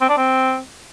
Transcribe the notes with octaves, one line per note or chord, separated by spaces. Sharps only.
C4
D4
C4